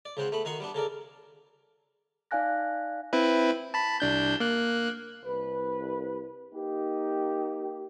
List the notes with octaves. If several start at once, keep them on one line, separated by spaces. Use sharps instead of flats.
D5
C#2 C#3 C4 C5 F#5
A3 B3 B5
D#3 D#4 F#4 C6 C#6
G3 B3 D4
C#3 A4 A#4 D5
D#4 D5 F5 G#5 F#6 A#6
C4 E4 B4
A5 B5
C2 D4 G6
A#3 F#6
C2 B4
A#3 D#4 G4